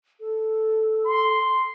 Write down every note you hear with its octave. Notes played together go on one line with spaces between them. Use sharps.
A4
C6